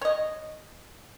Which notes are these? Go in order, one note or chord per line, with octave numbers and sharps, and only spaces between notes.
C#5 D#5